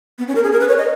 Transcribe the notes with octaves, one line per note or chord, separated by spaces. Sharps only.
B3
C#4
A#4
G#4
A#4
B4
C#5
D#5